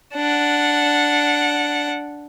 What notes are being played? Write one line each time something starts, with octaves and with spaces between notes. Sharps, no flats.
D4 F#5